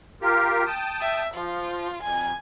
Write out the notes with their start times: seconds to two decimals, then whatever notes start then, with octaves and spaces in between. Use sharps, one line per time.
0.22 F4 G4 A#4
0.66 G5 A5 D#6
1.01 E5
1.34 F3 F4
2.03 F2 G#5